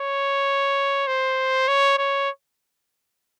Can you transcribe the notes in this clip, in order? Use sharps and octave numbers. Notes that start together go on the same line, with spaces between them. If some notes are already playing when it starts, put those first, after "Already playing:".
Already playing: C#5
C5
C#5
C#5